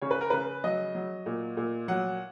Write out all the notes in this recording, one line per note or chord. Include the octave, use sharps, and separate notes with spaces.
C#3 C#5
B4
A#4
C#3 B4
F#3 D#5
F#3
A#2
A#2
F#3 F#5